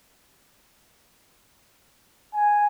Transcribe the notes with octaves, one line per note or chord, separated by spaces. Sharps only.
G#5